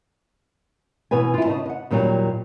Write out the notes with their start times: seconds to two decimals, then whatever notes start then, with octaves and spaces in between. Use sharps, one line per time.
1.11 B2 E3 B4 G#5
1.34 E4 F4
1.45 C#3 D#5 A5
1.65 D#5 F#5
1.91 D#2 A#2 F#3 G3